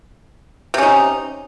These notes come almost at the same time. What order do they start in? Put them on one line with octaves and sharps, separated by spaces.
C3 C#4 D#4